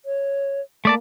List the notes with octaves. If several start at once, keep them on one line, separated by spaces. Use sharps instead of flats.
C#5
A3 A#3 D5 A5